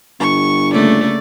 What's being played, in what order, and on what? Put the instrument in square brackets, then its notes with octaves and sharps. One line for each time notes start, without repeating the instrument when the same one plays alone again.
[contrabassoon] G1 [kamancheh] C#6
[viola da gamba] C#3 A3 A#3 [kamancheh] D5